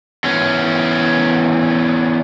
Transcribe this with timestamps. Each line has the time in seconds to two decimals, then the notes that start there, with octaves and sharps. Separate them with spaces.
0.24 E2 C#4